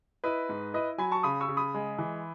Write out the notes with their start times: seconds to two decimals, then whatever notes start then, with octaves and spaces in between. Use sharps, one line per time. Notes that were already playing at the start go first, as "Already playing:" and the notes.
0.24 E4 B4 D#5
0.49 G#2
0.73 E4 B4 D#5
0.98 F#3 G#5 B5
1.11 A5 C#6
1.23 C#3 B5 D#6
1.40 C#6 E6
1.48 C#3
1.57 B5 D#6
1.74 G#3
1.98 E3